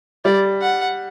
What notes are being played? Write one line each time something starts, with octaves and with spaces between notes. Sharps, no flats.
G3 D5
F#5